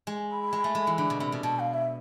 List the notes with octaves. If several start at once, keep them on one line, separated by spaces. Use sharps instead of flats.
G#3
B5
G#3
A3
G#3
E3
D3
B2
C3
B2
B2 A5
F5
E5